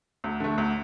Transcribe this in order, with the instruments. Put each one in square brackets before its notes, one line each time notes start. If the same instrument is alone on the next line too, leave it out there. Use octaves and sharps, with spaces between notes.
[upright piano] D2
D3 A3
D2